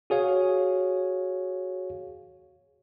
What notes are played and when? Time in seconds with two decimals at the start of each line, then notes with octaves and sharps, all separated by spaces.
0.10 F#4 G#4 C#5 F5